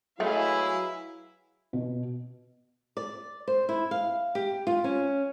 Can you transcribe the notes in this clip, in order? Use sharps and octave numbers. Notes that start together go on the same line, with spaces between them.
F#3 G#3 A3 E4 G#4 B4 F5
B2
D5
C5
E4
F5
G4
F4
C#4